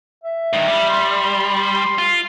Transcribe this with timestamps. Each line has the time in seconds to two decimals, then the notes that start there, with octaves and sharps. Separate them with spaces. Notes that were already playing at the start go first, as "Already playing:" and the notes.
0.24 E5
0.53 G2 D#3
0.68 G3
0.90 C6
1.98 F4